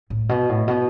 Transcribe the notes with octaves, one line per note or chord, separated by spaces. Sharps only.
A2
B2
A2
B2